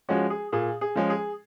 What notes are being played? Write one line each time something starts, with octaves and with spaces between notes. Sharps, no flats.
F3 G#3 C#4 F#4
G#4
A#2 G#4
G#4
F3 G#3 C#4
G#4